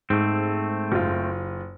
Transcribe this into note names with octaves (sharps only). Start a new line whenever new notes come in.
G#2 A3 C4
F#1 F4